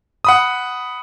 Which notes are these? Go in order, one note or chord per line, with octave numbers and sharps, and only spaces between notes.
F#5 B5 D#6